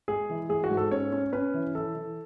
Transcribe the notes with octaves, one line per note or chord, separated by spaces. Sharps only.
G#3 G#4
E3
G#3 G#4
F#4
G#2
A4
C#4 C#5
C#4
C#4 B4
E3
E3 A4
E3